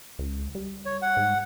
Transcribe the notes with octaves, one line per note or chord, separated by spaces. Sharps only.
C#2
G3
C#5
F#5
G#2